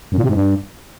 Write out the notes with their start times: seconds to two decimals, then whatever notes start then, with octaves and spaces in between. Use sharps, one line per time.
0.12 F#2
0.18 A#2
0.24 C3
0.29 G#2
0.35 G2